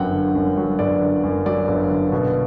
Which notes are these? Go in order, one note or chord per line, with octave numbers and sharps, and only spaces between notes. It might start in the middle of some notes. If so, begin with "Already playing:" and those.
Already playing: G1 F#2 F#3 F#5 G5
D3
F#2
F#3
G1 D5
D3
F#2
F#3 D5
G1
D3
B2